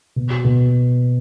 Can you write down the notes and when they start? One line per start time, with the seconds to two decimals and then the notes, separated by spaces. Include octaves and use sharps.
0.16 B2
0.30 F#4
0.44 B2